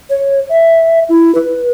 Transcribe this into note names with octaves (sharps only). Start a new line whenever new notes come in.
C#5
E5
E4
B4